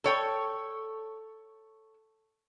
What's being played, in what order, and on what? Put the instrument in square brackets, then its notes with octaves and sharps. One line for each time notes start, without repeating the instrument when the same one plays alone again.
[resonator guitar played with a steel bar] A4 C#5 G5